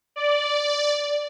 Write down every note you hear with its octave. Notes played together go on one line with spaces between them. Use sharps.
D5